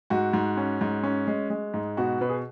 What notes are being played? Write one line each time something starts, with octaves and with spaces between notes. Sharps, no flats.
G#2 F#4
G#2
C#4
G#2
C#4
G#3
G#3
G#2
B2 F#4
B2 B4
G#4